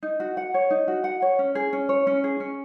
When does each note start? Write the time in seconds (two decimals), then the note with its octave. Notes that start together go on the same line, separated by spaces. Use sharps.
0.03 D#4
0.20 F#4
0.37 F#5
0.54 C#5
0.71 D#4
0.88 F#4
1.04 F#5
1.22 C#5
1.39 C#4
1.55 G#4
1.73 C#4
1.89 C#5
2.07 C#4
2.24 G#4
2.40 C#4